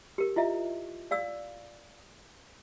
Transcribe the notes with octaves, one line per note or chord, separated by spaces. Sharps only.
G4 A#4
E4 F4 D#5 E5
D5 F5 E6